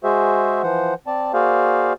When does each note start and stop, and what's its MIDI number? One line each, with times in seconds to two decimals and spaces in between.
0.04 0.62 56
0.04 0.62 66
0.04 0.62 68
0.04 0.62 72
0.04 0.62 76
0.63 0.94 52
0.63 0.94 53
0.63 0.94 72
0.63 0.94 78
1.07 1.32 60
1.07 1.32 74
1.07 1.32 81
1.34 1.93 58
1.34 1.93 66
1.34 1.93 68
1.34 1.93 72
1.34 1.93 74
1.34 1.93 77